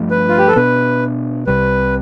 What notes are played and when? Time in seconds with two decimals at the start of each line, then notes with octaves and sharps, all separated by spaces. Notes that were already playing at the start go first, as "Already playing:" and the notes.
Already playing: G2 F3 A3
0.11 B4
0.28 F4
0.38 G4
0.48 A4
0.56 B2 B3 D4 B4
1.47 C2 C3 G3 B4